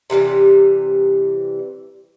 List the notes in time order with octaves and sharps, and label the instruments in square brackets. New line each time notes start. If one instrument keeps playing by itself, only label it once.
[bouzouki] C3 E3 F#3 G3